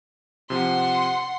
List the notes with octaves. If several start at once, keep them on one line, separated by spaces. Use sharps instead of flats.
C3 F3 F#5 C6